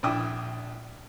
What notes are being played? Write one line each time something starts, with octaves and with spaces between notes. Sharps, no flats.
A#1 D4 E4 G5 D6 D#6